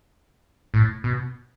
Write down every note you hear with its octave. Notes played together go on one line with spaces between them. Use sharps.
A2
B2